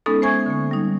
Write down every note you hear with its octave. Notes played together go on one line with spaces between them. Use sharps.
G#3 B3 C#4 D#4 A4
C5 E5 G#5 C#6 G#6
D3 A#3
G3 D#4